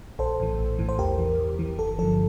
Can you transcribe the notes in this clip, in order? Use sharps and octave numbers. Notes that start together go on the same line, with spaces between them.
A#1 A4 C5
A2 E3
A#1
A2 E3
C5
E2 G4 A#4
E3
E2
E3
G1 A4
G2 D3 F3 A4